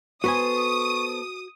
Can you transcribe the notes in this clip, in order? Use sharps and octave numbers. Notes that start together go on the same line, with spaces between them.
B3 F#4 A4 B4 C5 G#5 C#6 D#6